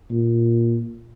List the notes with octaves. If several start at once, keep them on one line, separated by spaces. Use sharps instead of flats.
A#2